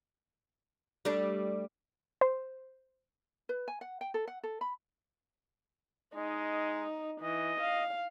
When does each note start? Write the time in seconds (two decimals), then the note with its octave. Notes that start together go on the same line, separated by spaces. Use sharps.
1.05 G3 A3 D4
2.21 C5
3.49 B4
3.68 G#5
3.81 F#5
4.01 G5
4.14 A4
4.28 F#5
4.43 A4
4.61 B5
6.15 G#3 D#4
7.21 E3 D#5
7.61 F5